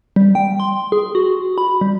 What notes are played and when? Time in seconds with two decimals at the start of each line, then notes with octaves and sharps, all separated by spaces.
0.16 G3
0.35 G5
0.60 C6
0.92 G#4
1.15 F#4
1.58 B5
1.81 G3